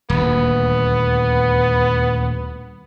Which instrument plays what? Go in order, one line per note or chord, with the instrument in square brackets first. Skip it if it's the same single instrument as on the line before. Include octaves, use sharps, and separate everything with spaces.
[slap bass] D#1 D2 [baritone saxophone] B3